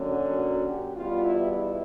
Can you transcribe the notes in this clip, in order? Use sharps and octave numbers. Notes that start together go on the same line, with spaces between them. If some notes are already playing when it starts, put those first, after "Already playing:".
Already playing: F#2 D3 F#3 A#3 C#4
F#4
F#4
G4
E2 B2 G3 B3 F4
E4
E4